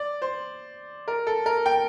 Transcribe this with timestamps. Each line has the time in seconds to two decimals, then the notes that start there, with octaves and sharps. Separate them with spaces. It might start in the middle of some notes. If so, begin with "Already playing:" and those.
Already playing: D5
0.22 C5
1.08 A#4
1.27 A4
1.46 A#4
1.66 G5